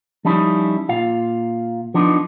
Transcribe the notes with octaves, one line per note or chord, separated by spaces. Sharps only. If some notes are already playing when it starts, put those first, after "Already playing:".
F3 G3 C#4 D#4 E4 E5
A#2 F4 F5
F3 B3 D4 D#4